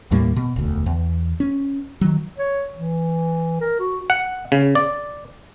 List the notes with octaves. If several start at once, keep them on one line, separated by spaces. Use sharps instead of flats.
D#2 A2 G3 A#3
B2
E1 D2
E2
C#4
D#3 F#3
C#5
E3
A#4
F#4
F#5
C#3
D5